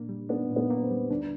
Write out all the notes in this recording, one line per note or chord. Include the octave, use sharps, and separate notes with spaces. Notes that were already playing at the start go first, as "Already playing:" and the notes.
Already playing: A#2 A#3 D4
G3
B3 D4
A#2
B3
A#3
C4
G3
D2 D4